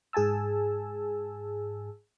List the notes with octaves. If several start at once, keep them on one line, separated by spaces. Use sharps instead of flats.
G#2 G#4 G#5 A5 E6